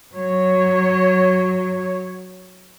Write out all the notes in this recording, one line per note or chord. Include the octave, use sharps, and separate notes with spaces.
F#3 C#5